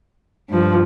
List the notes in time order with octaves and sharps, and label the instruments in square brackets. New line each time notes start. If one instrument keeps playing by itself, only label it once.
[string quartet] G2 F3